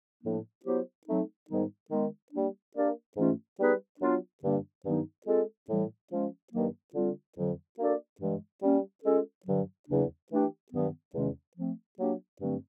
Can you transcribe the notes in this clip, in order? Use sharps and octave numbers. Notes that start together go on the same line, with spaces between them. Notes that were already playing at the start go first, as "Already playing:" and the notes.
A2 F3 A#3 D4
F#3 B3 E4 G4 C5
F#3 A3 C4 D#4
G#2 D#3 G3 B3 D#4
D#3 G#3 B3 D#4
G3 A#3 D4
A#3 D4 G4 A#4 D5
G#2 E3 A3 C#4 F4
G3 B3 D#4 G#4 B4
F#3 B3 D4 F4
G2 D3 G3 A#3 D4
G2 D#3 F#3 B3 D#4
G#3 C4 F4 A4
A2 E3 G3
F3 G#3 C#4
G2 D#3 F#3 A#3
D3 G3 C4 F4
F2 D3 F#3
A#3 D4 F#4 A4 D5
G2 E3 G#3
G3 A#3 C#4
G#3 C#4 F4 A4
G2 D3 F#3
E2 C#3 F#3 A#3 D4
E3 A3 D4 G4
G2 D#3 F#3 B3
E2 C3 D#3 G#3 C#4
F3 A3 C4
F#3 A#3 D4 G4
G2 D3 F#3 A3 C4